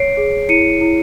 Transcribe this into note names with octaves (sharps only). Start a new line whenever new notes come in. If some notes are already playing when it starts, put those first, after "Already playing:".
Already playing: C#5 C7 D7
G#4
E4 C#7 D#7
E4